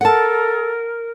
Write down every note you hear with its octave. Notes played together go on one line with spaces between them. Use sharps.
A4 A#4 F#5 A5